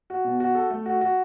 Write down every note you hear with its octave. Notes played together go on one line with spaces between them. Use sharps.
F#4
B2
F#4
A4
A3
F#4
F#4